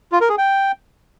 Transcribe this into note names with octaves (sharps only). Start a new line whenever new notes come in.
F4
A#4
G#4
G5